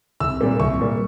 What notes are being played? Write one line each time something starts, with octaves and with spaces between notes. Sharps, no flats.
C2 E6
A#2 G3 A#3
C2 C#6
A#2 G3 A#3